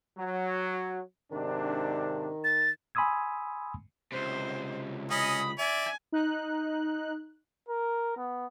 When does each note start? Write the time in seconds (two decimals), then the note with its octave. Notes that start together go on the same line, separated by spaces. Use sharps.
0.18 F#3
1.31 G#2 C3 D#3 D4
2.44 A6
2.95 G#5 B5 C6 D#6 E6 G#6
4.12 C#2 C3 C5
5.11 C#4 D#5 B5 D#6
5.58 D5 E5 G#5
6.12 D#4 F#6
7.68 A#4
8.17 B3